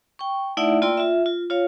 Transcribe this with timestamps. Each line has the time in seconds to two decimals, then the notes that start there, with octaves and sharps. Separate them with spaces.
0.19 G5 C#6
0.57 A3 D#4 E4 D5 E5 F#5
0.82 A#3 F4 D5 G5 C6 E6
0.97 F4 E5
1.26 F4
1.50 F4 C#5 F5